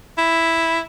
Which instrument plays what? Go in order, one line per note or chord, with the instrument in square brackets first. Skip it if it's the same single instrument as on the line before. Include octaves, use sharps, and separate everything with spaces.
[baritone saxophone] E4